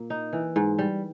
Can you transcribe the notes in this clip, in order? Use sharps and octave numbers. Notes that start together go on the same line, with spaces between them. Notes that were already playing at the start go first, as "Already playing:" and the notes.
Already playing: A#2 A#3
D#4
E3
G#2
G3